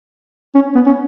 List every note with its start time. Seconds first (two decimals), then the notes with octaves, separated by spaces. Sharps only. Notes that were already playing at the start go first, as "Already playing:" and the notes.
0.55 C#4
0.75 B3
0.86 C#4